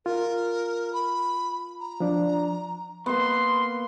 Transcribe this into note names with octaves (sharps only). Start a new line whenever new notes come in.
F4 A#4
B5
A#5
F3 D4 D5
A#3 B3 C6